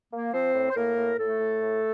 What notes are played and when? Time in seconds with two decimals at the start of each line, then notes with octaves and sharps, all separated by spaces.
0.12 A#3
0.32 F3 C4 C5
0.54 A2
0.70 C5
0.75 A2 A#3 A#4
0.97 A2
1.18 A2 A3 A4
1.39 A2
1.62 A2